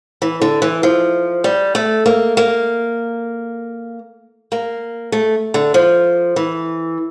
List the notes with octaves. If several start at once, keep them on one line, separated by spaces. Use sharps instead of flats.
E3
D3
E3
F3
G3
A3
A#3
A#3
A#3
A3
D3
F3
E3